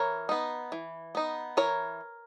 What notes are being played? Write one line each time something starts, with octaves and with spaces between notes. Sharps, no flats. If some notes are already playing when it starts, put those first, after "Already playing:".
Already playing: E3 A#4 C#5
B3 D#4
E3
B3 D#4
E3 A#4 C#5